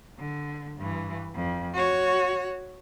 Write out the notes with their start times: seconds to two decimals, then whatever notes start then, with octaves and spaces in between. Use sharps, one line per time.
0.19 D3
0.77 G2 E3
1.35 F2
1.74 F#4 C#5